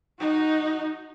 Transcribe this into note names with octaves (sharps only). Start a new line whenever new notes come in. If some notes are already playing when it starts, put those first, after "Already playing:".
D#4 F#4